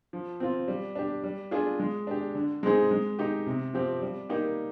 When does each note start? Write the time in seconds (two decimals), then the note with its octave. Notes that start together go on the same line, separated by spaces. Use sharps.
0.13 F3
0.40 C4 F4
0.68 G3
0.95 D4 G4
1.24 G3
1.51 D4 F4 G#4
1.80 G#3
2.07 D4 G4
2.35 D3
2.63 G#3 C4 D#4 G#4
2.91 G#3
3.19 D#4 G4
3.46 C3
3.74 F3 C4 G4
4.02 G3
4.29 A#3 D#4 G4